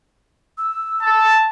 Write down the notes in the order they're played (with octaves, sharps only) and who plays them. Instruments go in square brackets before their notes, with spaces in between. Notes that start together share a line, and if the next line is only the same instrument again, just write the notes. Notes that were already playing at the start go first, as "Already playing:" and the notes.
[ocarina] E6
[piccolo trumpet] A5